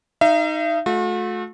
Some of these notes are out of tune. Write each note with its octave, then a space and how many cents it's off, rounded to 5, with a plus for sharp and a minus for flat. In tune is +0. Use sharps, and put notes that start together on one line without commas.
D#4 +0 E5 +45
A3 -25 F#4 -45